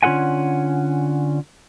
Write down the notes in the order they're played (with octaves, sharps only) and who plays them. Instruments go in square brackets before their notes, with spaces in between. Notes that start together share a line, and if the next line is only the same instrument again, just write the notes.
[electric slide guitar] D3 C#4 F4 A4 F#5 G#5